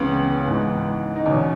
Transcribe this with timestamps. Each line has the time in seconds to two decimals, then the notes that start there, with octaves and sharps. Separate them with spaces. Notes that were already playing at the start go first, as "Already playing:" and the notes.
Already playing: C#2 C#3 E3 B3
0.47 G#2 E3
1.16 D#4
1.26 E2 B2 C#4